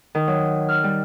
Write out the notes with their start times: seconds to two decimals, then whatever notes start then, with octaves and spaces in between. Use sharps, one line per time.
0.15 D#3
0.27 F#3
0.69 F6
0.84 G3